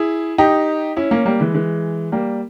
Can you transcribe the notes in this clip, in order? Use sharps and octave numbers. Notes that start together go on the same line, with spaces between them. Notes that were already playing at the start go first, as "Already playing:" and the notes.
Already playing: E4 G#4
D#4 G4
C#4 E4
A#3 C#4
G3 A#3
E3 G#3
E3 G#3
G3 A#3